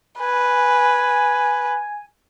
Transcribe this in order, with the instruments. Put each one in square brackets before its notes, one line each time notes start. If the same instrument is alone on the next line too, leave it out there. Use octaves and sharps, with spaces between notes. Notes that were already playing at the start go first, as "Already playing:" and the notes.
[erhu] B4 [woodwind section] G#5